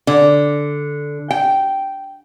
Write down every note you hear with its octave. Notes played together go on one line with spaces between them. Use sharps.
D3
G5